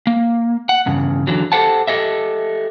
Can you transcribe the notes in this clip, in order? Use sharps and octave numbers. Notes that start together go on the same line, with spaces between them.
A#3
F#5
E2 G2 C#3
D3 E3 F#3
G4 A4 C5 F#5 A5
G4 A4 D#5 E5